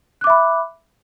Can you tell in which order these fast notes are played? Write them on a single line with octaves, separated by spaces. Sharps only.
F#6 D6 E5 B5